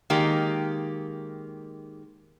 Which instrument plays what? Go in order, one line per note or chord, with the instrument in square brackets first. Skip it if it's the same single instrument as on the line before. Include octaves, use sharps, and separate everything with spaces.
[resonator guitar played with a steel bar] D#3 G#3 A#3 G4